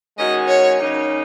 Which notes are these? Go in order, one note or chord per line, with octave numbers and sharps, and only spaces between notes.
D#3 G#3 C#4 F#4 D#5
C#5
C#3 F#3 A#3 D#4